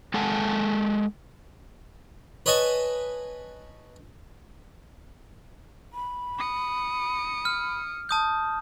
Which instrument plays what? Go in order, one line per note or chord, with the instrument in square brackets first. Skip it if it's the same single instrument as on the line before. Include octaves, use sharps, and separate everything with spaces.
[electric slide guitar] G#3 A4 F#5 G#5 A5
[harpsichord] B4 C#5 D#5 G#5 A5 C#6
[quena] B5
[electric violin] D#6 C#7
[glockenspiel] F6
A5 D#6 G6